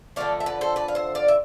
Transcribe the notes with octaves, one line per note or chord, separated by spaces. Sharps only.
D3 F3 A3 D5 F5
E5
B4 D5
A4 C5
B4 D5
F5
C5 E5
D5 F5
E5